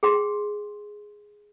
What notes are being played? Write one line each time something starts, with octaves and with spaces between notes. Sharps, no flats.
G#4 G5 C6